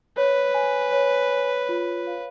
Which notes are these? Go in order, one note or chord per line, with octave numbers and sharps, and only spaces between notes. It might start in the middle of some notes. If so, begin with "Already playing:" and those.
B4 C#5
G#5
C#5
C#5
F4
F5